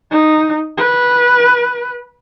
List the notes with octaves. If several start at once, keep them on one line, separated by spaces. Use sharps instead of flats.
D#4
B4